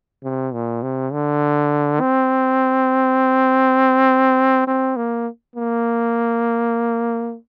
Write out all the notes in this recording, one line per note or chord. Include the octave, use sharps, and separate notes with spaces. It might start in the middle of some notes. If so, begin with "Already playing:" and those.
C3
A#2
C3
D3
C4
C4
A#3
A#3